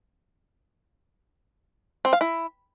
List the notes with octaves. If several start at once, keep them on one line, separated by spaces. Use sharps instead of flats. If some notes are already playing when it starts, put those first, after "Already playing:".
C4
F5
E4